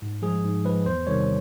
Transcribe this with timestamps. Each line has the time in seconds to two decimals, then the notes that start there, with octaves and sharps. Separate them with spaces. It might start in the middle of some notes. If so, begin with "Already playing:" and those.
0.02 G#2
0.22 F3 G#3 G#4
0.44 G#2
0.64 F3 G#3 B4
0.86 E2 C5
1.07 C3 D#3 G3 C#5